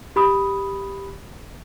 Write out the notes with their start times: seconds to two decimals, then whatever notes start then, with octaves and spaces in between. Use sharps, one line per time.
0.16 G4 B5 D#6